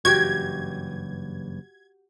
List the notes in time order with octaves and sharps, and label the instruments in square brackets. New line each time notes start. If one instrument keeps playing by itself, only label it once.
[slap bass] F#1 G2 E3 [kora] F#4 G4 [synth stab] G#6